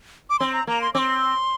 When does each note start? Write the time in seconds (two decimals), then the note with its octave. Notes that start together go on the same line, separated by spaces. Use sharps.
0.30 D6
0.39 C4 C6
0.53 A#5
0.67 A#3 A#5
0.81 C6
0.94 C4 C6 D6